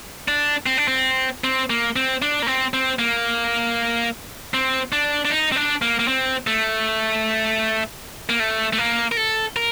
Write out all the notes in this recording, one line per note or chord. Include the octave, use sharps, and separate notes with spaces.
D4
C4
D4
C4
C4
A#3
C4
D4
A#3
C4
C4
A#3
C4
D4
D4
D#4
C4
D4
A#3
A#3
C4
A3
A#3
A3
A3
A#3
A#4
A4
A#4